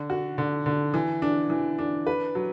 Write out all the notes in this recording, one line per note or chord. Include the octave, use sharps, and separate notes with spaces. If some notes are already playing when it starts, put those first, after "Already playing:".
Already playing: D3
F#4
D3
D3
E3
D4
E3
D4
B4
F#3